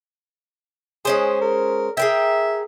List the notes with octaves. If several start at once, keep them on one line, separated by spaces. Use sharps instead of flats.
G#3 C#4 G#4 C5
A#4
G#4 A#4 E5 G5